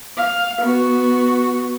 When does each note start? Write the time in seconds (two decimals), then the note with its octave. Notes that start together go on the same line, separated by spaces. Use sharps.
0.17 F5
0.62 B3 F#4